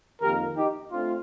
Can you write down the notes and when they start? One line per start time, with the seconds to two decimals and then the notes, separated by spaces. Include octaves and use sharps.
0.21 F2 D#3 A#3 G4 A#4
0.56 D#4 G4
0.91 A3 C4 D4 F4